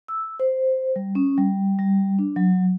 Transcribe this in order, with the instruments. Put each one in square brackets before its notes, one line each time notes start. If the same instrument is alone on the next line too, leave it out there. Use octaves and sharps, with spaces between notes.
[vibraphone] E6
C5
G3
C#4
G3
G3
D4
F#3